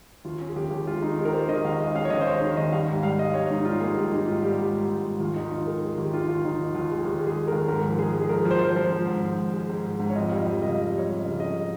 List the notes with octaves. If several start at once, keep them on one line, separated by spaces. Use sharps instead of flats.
D#2 F4
C#4
G#4
D#2 G4
D#2
G#3 F4
D#3 D#4
G#3 G4
A#4
G#3 C5
D#3 D#5
D#2 F5
F5
G#3 D#5
C#4 F5
C#5
D#2 D#5
C5
G#3 C#5
D#3
D#2 D#5
G3 F5
G#2
G3 F5
G3 D#5
G#2 C#5
G#2 D#4
D#4
G3 F4
A#3 G#4
G#2 G4
G#2 D#4
G#2 F4
G3 G4
G#2
G#2
G#2
G#2
D#2 F4
D#3 D#4
D#3 F4
G#3 A#4
G#3
D#2 G4
D#3 F4
D#2 F4
D#2 D#4
D#2
D#2 F4
G#3
G#4
D#2 G4
G#3
G#4
G#3
D#2 A#4
G#2 A#4
F3
G#3 G#4
G#3
G#4
F3 A#4
F3
C5
F3
C5
F3
G#2
G#2
G#2
G#2
G#3
G#2
G#3
G#2
C#5
F2 D#5
G3 F5
D#5
F2 F5
C#3 D#5
F2 D#5
G3
C#5
G3
D#5
C#3
C#3 D#5